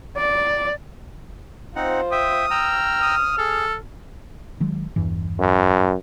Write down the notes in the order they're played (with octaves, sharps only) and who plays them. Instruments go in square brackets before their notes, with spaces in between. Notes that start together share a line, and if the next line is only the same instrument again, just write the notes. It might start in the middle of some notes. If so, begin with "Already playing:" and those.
[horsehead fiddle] D5
[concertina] C4 D#4 F#5 [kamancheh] F4 C5
[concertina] E5 G5 [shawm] D#6
[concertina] G5 A#5 E6 [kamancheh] F6
[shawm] D#6
[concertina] G#4 [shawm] A4
[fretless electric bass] D#3 F#3 G#3
E2 G2 E3
[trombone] F#2